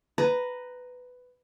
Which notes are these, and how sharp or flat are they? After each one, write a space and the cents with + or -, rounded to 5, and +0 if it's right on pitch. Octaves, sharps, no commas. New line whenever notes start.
B4 +10 A#5 +0